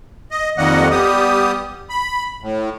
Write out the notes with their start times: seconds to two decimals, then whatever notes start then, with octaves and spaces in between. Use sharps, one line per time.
0.31 D#5
0.58 F2 D#3 G3 A#3 D#5 F#5
0.91 G3 B3 G4 D#6
1.90 B5
2.42 A2